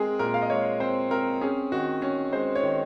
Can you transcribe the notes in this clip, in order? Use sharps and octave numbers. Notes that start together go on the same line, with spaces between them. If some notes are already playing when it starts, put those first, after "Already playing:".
Already playing: G#3 C4 G#4 A#4
A#2 A#4
F5
D#5
G#3 C#5
C4 C5
C4 A#4
C#4 G#4
D#3 F#4
C#4
G#3 C5
C#5
D#3